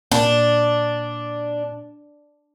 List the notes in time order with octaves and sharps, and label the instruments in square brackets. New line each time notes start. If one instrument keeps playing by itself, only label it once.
[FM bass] A#2 [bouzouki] D4